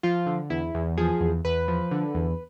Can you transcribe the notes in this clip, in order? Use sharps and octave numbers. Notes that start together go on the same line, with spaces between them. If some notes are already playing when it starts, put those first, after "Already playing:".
F3 F4
D3
E2 E4
E2
F3 G#4
E2
E2 B4
F3
D3
E2